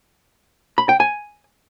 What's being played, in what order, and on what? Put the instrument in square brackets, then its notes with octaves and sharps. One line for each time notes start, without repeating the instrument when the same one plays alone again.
[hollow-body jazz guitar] B5
G5
G#5